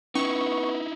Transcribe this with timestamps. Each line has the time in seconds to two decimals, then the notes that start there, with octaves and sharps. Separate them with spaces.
0.15 B3 C#4 D#4 E4 C#6